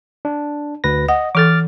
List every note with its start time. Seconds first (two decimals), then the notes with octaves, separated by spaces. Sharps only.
0.25 D4
0.84 D2 B4 A#6
1.08 D#5 F#5
1.35 E3 A4 D6 F6 A6